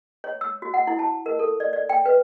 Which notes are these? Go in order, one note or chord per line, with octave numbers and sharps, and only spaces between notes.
C#5
E6
F#4
F#5
E4
A5
A#4
A4
D5
D5
G5
B4